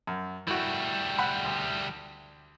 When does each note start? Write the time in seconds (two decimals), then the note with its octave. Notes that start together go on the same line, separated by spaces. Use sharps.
0.07 F#2
0.47 G3 A3 E4 F#4
1.19 F#5 B5
1.44 D2